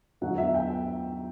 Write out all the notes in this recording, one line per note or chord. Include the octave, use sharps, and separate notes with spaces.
E2 D3 F#3 B3 F#5
E5
G5